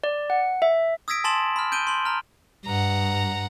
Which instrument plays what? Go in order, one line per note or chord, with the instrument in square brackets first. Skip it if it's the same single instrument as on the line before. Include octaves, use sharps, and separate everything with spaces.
[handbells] D5
F#5
E5
[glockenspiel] D#6 E6 G#6 A#6 B6 D7
G#5 A5 C6 A6 E7 F#7
B5 F6
G6 D7 D#7 G7
C6 F#7
A#5 F6
[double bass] G2 [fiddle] F#5 A#5